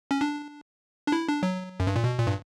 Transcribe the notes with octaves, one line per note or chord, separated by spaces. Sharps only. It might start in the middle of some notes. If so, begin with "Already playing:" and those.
C#4
D4
D4
E4
D4
F#3
F#2
G2
A#2
B2
A#2
G2